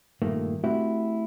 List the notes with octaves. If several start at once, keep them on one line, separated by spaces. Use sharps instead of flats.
G2 A#2 D#3 A3 A#3
A3 C4 E4 F#4 G4 E5